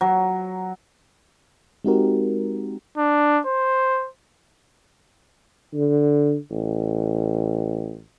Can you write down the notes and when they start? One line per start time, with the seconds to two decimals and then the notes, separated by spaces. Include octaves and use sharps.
0.01 F#3
1.84 G#3 C4 D#4 F#4 G4 A#4
2.97 D4
3.47 C5
5.74 D3
6.51 A1